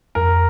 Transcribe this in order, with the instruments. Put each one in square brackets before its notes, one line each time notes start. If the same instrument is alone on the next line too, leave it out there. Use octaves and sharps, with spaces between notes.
[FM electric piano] F2 [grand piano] A#4